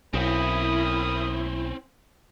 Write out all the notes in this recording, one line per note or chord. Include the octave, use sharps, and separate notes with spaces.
B1 C4 C#4 E4 A#4 B5 D#6